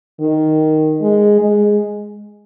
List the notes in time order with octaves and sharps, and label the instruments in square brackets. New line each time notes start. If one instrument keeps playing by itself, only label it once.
[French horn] D#3
G#3
G#3